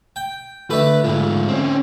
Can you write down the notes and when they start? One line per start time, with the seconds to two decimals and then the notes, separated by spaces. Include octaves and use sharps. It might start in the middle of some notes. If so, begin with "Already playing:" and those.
0.16 G5
0.70 D3 A3 B4
1.04 G#2 F4
1.48 C4 C#4